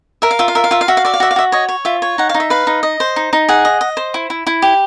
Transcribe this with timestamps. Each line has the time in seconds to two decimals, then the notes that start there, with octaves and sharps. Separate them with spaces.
0.22 A#4 E5
0.31 F5
0.39 F4 E5
0.48 F5
0.55 A#4 E5
0.64 F5
0.71 F4 E5
0.81 F5
0.88 F#4 E5
0.97 F5
1.05 D5 E5
1.14 F5
1.20 F#4 E5
1.31 F5
1.36 F#4 E5
1.52 C#5 D#5
1.69 C#5
1.85 F4 E5
2.02 C#5
2.18 D#4 F#5
2.29 D#4 F5
2.40 E5
2.50 B4 F5
2.67 D#4
2.83 D#5
3.00 C5
3.16 D#4
3.33 D#4
3.49 G#4 F#5
3.65 D#5
3.81 D#5
3.97 C5
4.14 E4
4.30 E4
4.47 E4
4.62 G4